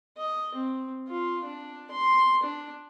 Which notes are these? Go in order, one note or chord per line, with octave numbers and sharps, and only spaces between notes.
D#5
C4
F4
D4
C6
D4